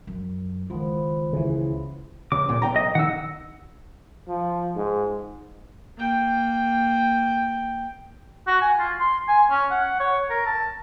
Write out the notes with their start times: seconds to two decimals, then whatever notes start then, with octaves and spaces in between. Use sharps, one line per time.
0.07 F#2
0.70 C#2 D#3 F3 B3 F4
1.33 C#3 E3
2.32 C#2 D6
2.49 C#2 A#2
2.62 B1 G5 A#5
2.76 D#5
2.95 D#3 D#4 F#5 E6
4.28 F3
4.76 G#2
5.98 A#3 G5
8.47 F#4
8.61 G#5
8.79 F4
8.99 C6
9.28 G#5
9.50 C#4
9.71 F#5
10.00 C#5
10.30 A#4
10.46 A5